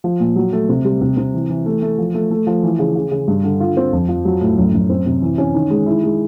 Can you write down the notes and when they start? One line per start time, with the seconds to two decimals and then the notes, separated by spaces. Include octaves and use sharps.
0.04 F3
0.20 A#2
0.36 F#3
0.53 A3
0.69 C3
0.85 G3
1.01 C3
1.17 C3
1.34 E3
1.50 E3
1.66 A3
1.82 A3
1.98 F3
2.14 A3
2.31 A3
2.47 F3
2.63 E3
2.79 C#3
2.95 C#3
3.11 C#3
3.28 G2
3.43 D3
3.60 F4
3.77 C4
3.92 F2
4.09 F3
4.25 F#3
4.41 A2
4.58 F#2
4.74 F#2
4.90 C4
5.06 C3
5.22 E3
5.38 C#4
5.54 D#3
5.70 G#3
5.86 E4
6.03 G#3